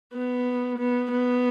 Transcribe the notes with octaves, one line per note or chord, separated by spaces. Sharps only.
B3
B3
B3